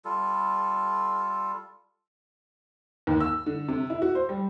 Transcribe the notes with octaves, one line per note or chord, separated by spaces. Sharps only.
G3 F4 A4
D#2
E6
D3
C3
E4
F#4
C5
G3